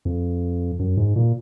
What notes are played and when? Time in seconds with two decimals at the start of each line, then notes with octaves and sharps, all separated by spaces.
0.05 F2
0.79 F#2
0.97 G#2
1.16 A#2